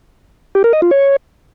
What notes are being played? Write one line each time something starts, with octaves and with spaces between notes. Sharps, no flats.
G4
A#4
D#5
F4
C#5